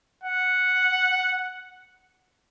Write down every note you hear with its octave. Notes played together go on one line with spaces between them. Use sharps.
F#5